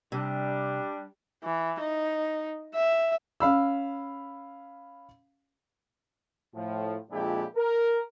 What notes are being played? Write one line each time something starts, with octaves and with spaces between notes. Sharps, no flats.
C3 G3 D4
E3
D#4
E5
C#4 F5 B5 E6
A2 F3
F2 A#2 G#3 D4 E4 G4
A#4